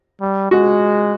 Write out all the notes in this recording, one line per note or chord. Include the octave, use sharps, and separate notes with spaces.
G3
G#3 F#4